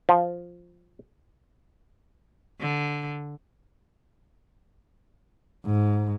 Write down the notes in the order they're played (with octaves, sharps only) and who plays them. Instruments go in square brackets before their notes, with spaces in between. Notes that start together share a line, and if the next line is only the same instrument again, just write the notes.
[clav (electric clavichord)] F3
[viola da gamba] D3
[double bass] G#2